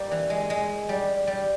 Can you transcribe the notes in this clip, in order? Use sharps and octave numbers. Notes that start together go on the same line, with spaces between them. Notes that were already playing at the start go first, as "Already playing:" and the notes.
Already playing: G3 A#3
E3
G#3
G#3
G3
G3